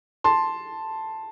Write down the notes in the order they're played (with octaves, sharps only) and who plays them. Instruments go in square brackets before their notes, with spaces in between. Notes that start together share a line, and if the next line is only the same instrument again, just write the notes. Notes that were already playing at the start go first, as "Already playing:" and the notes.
[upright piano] A5 C6